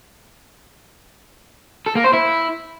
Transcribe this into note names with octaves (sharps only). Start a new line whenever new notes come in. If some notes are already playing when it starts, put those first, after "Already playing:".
A4
A#3
C5
E4